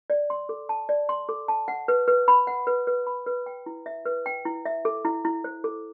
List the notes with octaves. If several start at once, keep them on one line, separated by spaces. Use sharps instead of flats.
D5
C6
A4
A5
D5
C6
A4
A5
F#5
B4
B4
B5
F#5
B4
B4
B5
B4
G5
E4
E5
B4
G5
E4
E5
A4
E4
E4
C5
A4